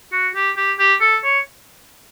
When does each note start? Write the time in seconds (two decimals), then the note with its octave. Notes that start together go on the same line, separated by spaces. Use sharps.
0.12 F#4
0.35 G4
0.57 G4
0.79 G4
1.01 A4
1.24 C#5